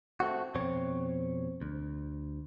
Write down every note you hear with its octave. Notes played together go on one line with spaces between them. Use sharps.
A3 C4 F#4
F2 B2 C4 C#5
D2